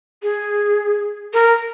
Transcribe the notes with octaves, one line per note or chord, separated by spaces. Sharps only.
G#4
A#4